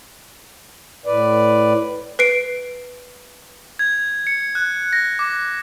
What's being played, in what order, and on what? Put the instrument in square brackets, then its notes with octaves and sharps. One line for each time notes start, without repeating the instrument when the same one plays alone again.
[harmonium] A2 B4 D5
[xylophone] B4 C7 D7
[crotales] G#6
C#7
F#6
A#6
D6